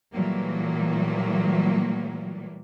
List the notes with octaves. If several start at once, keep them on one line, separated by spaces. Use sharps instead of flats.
A#2 E3 F#3 G3 A3 A#3